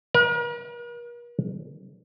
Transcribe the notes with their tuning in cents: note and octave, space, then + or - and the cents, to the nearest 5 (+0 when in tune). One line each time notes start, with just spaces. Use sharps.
A#4 +45